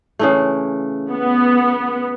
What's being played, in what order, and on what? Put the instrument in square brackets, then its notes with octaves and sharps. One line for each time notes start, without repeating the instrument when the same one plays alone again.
[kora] C#3 E3 A3
[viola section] B3